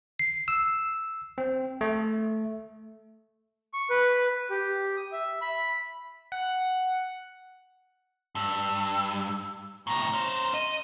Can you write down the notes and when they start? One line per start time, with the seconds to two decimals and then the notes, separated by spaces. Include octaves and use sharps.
0.19 C7
0.48 E6
1.38 C4
1.81 A3
3.73 C#6
3.90 B4
4.50 G4
4.97 D#6
5.12 E5
5.41 B5
6.32 F#5
8.35 G2 E6
9.87 A2 C3 A#5
10.13 C#4 C5
10.54 D#5 D#7